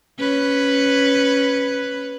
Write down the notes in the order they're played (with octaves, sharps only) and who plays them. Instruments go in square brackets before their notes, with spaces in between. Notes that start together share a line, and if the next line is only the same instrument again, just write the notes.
[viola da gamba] C#4 B4